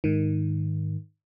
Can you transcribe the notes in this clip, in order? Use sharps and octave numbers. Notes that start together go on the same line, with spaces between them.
G#2 D#3